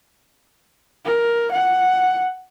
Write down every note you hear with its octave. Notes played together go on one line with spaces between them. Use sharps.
A#4
F#5